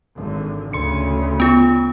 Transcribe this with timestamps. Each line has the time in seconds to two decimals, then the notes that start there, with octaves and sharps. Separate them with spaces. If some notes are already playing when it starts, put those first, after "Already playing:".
0.17 G#1 D3
0.73 D2 C#3 C6 C#7
1.40 B3 F4